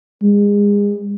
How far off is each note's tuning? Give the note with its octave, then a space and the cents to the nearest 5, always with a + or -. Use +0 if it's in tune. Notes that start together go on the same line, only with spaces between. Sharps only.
G#3 -30